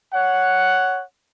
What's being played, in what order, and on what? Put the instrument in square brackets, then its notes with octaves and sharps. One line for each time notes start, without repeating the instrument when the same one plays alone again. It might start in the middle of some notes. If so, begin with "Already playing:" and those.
[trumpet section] C#5 F#5